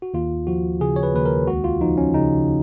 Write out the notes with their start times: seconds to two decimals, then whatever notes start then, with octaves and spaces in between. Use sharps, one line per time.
0.02 F#4
0.14 D#2 F4
0.47 F3 F#4
0.80 C#3 G#4
0.96 C#5
1.03 B4
1.14 D#2 B4
1.26 A#4
1.48 C#2 F#4
1.64 F4
1.81 F3 D#4
1.98 C#4
2.14 C#3 D#4